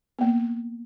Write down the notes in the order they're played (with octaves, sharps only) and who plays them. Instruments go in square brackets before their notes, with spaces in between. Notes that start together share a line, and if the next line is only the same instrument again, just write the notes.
[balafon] A#3 B3